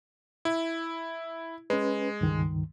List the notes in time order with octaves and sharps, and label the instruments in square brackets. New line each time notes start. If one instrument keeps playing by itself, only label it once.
[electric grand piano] E4
[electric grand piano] G#3 [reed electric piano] C#4 B4
[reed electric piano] C#2 G2 D#3